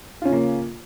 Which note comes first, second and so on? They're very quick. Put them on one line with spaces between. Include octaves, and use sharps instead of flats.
F4 C#4 C#3 A#3